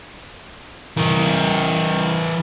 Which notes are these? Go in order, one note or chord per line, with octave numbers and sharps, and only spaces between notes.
E3 A#4